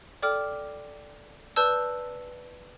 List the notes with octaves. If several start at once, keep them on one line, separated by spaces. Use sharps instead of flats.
A4 D5 G5 D6 F6
B4 D5 A5 E6 G6